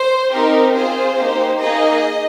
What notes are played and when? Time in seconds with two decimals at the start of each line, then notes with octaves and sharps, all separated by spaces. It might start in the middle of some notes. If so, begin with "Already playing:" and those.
Already playing: C5
0.32 C4 D#4 G4 A#4
0.74 C4 F4 G#4 C5
1.17 A#3 D#4 G4
1.59 A#3 D#4 G#4 D#5